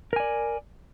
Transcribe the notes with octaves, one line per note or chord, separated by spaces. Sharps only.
A#4 D5 G#5